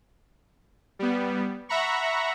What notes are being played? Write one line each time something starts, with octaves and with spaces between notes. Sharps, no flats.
G3 B3
E5 F#5 A#5 B5 C#6